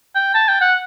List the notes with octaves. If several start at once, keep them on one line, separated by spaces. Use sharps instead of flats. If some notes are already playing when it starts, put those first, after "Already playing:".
G5
A5
G5
F#5